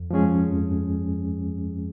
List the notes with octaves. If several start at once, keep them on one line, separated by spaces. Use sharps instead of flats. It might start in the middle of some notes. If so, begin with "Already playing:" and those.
Already playing: F2
F3 G#3 C#4 G#4
F2